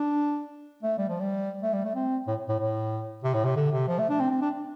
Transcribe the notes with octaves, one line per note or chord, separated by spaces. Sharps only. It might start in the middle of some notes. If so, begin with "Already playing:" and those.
Already playing: D4
A3
G3
F3
G3
A3
G3
A3
C4
A2
A2
A2
C3
A2
C3
D3
C3
F3
A3
D4
C4
C4
D4